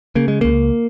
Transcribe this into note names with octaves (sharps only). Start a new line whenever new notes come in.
C#3 A#3
G#3
C#2 A#3